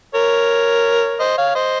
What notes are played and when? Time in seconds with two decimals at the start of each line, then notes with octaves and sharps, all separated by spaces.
0.15 A#4 C#5
1.20 C5 D#5
1.37 C#5 F5
1.55 C5 D#5